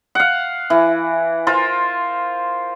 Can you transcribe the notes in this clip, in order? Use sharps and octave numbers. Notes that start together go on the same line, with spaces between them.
F5 F#5
E3
F4 A#4 C5